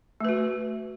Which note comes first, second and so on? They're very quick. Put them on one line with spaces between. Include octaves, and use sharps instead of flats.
A3 B4 F#4